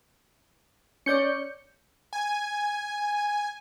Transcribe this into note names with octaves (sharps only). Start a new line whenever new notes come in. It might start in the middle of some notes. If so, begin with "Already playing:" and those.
C#4 C#5 D5 G6 C#7
G#5